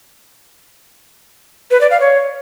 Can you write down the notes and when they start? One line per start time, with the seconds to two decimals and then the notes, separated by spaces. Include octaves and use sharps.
1.71 B4
1.81 D5
1.91 F5
2.01 C#5